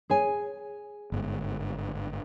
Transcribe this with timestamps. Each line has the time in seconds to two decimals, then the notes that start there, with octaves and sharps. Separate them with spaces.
0.10 G#4 C#5 G#5
1.12 G1 G#2